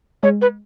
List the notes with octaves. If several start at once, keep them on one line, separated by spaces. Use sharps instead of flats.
G#3 C#5
B4